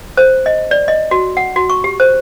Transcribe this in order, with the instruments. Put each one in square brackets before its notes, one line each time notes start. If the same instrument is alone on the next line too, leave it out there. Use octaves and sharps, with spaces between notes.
[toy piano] C5
D#5
D5
D#5
F#4
F#5
F#4
C#6
G4
C5